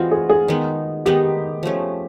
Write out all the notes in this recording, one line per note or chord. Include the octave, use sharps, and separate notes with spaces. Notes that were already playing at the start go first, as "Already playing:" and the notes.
Already playing: E3 G#3 C4 F4 F#4
G#4
G#4
D#3 G#3 B3 D#4
D#3 G#3 B3 D#4 G4
F3 A3 C#4